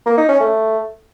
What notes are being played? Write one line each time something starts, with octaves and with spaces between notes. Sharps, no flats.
A#3
D#4
C#4
A3